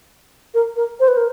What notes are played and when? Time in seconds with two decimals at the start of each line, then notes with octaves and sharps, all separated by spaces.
0.54 A#4
0.76 A#4
1.00 C5
1.08 B4
1.17 A#4